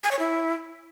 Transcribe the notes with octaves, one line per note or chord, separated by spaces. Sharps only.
G#5
C#5
E4